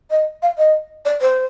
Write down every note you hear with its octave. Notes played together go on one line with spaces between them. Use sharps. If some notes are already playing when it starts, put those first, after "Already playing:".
D#5
F5
D#5
D5
C5